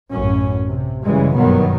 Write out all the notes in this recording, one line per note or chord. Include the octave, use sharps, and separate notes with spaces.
A1 F#2 C#4
C3
F#2 C#3 E3 G3 G#3
F#1 G2 B2 D#3 F#3 B3